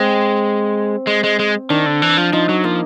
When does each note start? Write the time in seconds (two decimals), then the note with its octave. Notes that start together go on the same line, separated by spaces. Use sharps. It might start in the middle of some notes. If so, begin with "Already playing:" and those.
Already playing: G#3 C4
1.07 G#3
1.24 G#3
1.39 G#3
1.70 D#3 D4
1.86 D3
2.02 E3
2.17 F3
2.33 F3 D#4
2.49 F#3
2.64 F3 A#3